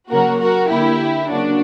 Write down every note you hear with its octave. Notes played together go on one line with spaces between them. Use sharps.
C#3 F#3 A#3 F#4 A#4
F#4 A#4
D3 A#3 E4 G4
C#3 F#3 A#3 D4 F#4